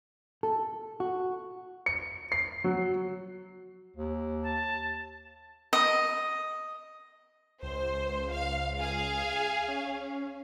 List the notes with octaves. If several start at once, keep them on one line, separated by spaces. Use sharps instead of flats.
A4
F#4
C#7
C7
F#3
D#2
A5
D#5
C#2 C5
F5
G#4 F5
C#4